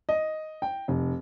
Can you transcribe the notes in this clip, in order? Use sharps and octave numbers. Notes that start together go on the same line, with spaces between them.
D#5
G5
F1